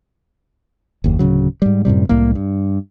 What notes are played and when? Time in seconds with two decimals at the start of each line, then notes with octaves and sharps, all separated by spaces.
1.04 F#1 D#2
1.19 D1 G1 C#3 F#3
1.62 G#2 G3
1.85 F#2 A2 C3 G3
2.09 C2 A2 G3 A#3
2.35 G2